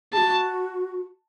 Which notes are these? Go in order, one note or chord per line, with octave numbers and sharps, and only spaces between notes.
F#4 G#4 A5